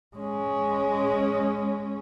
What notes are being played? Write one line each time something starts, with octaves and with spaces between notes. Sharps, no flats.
G#3 C#4